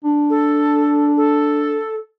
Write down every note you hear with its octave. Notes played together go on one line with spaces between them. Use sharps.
D4
A4
A4